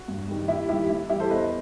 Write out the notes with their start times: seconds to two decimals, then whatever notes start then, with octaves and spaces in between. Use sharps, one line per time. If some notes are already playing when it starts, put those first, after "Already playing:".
Already playing: F#4
0.08 G2
0.28 D#3 G3
0.48 D#2 E4 G4
0.69 D#3 G3 E4 G4
0.89 A2 E4
1.09 E3 G3 E4 G4
1.20 A4 C5
1.30 E2 B4 D#5